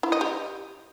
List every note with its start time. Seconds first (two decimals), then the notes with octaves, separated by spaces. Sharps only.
0.03 E4
0.12 D#5
0.21 G4